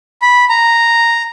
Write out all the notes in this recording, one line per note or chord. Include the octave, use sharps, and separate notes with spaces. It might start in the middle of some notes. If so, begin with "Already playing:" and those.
B5
A#5